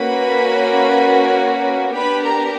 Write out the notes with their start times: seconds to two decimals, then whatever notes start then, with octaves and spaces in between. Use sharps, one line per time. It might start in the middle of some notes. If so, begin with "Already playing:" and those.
Already playing: A#3 C#4 F#4 B4 B5
1.95 B3 D4 G4 B4 B5
2.23 A#4 A#5